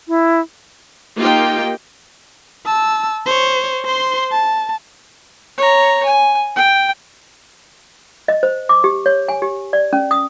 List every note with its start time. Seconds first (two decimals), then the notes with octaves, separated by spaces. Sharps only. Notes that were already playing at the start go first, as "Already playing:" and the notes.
0.08 E4
1.16 A#3 D#4 F4 G4 G5
2.66 A5 E6
3.26 C5 C#5
3.85 C5 C6
4.31 A5
5.57 C#5 A#5
6.05 G#5
6.56 G5
8.28 D#5
8.43 C5
8.69 D6
8.84 G4
9.06 C#5
9.28 G#5
9.42 G4
9.73 D5
9.93 C#4
10.11 D#6